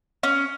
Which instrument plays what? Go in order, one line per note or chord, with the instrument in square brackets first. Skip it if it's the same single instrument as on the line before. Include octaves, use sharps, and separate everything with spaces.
[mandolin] C#4